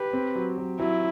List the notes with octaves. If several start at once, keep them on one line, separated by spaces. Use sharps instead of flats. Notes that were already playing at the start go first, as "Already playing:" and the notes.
Already playing: G4 B4
C4
F#3
F#3
F#3 E4